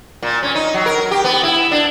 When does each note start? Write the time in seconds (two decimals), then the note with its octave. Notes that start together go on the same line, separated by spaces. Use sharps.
0.23 A#2
0.43 C#4
0.55 D#4
0.74 F#3
0.86 A#4
1.11 G4
1.24 B3
1.43 E4
1.71 D4